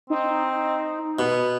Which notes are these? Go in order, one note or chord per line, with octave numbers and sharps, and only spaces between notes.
C4 D#4
B2 B3